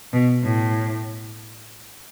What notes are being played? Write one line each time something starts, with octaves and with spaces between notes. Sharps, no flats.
B2
A2